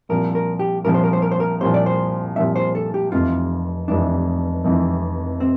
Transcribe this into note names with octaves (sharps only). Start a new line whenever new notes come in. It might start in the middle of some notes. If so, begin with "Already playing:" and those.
C2 A#2 F3 A#4
A#4
G4
C2 A#2 F3 A#4
C5
A#4
C5
A#4
C5
A#4
C2 A#2 F3 C5
D5
C5
C2 A#2 F3 E5
C5
A4
G4
F1 F2 C3 E3 F4
F1 F2 C3 E3 D4
F1 F2 C3 E3
C3 C4